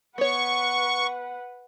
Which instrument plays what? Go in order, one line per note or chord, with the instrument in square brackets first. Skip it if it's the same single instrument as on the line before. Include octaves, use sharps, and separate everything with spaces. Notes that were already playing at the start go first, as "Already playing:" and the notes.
[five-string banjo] B3 C#5 [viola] B4 F#5 [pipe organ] C#6